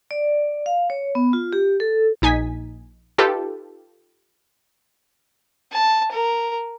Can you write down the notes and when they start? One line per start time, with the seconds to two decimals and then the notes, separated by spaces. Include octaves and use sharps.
0.11 D5
0.66 F5
0.90 C#5
1.15 B3
1.33 F4
1.53 G4
1.80 A4
2.22 A#1 D#4 G#5 B6
3.18 D#4 F4 G4 A4 B4
5.72 A5
6.12 A#4